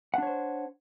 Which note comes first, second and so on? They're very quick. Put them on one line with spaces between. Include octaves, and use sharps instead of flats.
F#5 D4 C#5 C5